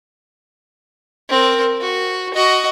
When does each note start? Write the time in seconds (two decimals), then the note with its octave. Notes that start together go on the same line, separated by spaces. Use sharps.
1.29 C4 A#4
1.81 F#4
2.34 F#4 D#5